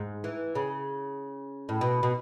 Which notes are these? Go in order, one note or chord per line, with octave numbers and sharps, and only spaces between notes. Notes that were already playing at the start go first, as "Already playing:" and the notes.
Already playing: G#2
E3
C#3
A2
B2
B2